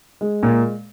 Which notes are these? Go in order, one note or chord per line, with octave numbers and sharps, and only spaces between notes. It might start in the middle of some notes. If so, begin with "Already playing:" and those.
G#3
A#2